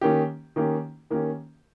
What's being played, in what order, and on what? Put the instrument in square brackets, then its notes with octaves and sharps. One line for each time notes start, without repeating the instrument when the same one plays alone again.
[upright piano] D#3 A#3 C#4 G4
D#3 A#3 C#4 G4
D#3 A#3 C#4 G4